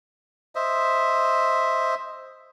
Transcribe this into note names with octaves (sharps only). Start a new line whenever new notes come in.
C5 D#5 E5